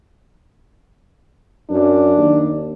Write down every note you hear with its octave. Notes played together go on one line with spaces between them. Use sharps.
F#2 D4
D#2